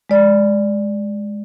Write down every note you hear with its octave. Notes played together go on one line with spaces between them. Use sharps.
G#3 D5